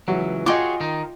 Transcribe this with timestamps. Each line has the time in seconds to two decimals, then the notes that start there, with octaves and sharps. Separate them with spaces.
0.08 C#2 E3 F#3
0.46 F4 F#4 G#4 C#5 D#5 G5 C6 D6
0.81 D#3 D#4